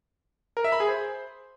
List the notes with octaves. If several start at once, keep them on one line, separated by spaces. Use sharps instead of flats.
A#4
E5
B5
G#4
C5